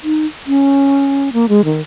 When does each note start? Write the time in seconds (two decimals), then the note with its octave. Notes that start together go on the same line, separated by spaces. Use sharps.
0.04 D#4
0.47 C#4
1.33 A#3
1.49 G#3
1.65 D#3